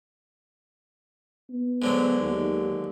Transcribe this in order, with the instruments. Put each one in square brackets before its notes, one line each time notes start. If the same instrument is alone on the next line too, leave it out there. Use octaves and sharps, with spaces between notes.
[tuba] B3
[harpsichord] G#2 D3 F#3
[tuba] D#2